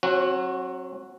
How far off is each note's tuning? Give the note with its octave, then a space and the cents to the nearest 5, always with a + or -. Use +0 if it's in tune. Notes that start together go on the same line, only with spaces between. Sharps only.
F#3 +0 C4 +40 F#4 +0